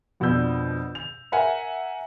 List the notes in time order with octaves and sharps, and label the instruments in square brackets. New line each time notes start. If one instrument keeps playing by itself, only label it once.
[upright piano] F2 B2 F3 D4 E6 G6
F7
A#4 E5 F#5 G#5